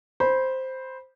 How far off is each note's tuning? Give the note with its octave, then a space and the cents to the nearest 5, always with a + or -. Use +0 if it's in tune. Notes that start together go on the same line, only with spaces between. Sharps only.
C5 +0 B5 -15